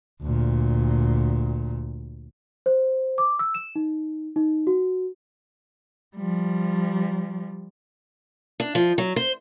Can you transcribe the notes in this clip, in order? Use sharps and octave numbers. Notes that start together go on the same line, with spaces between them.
D2 A#2
C5
D6
E6
E7
D#4
D#4
F#4
F3 G3
D4
F3
F#3
C5